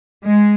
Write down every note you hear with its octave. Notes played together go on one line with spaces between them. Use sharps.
G#3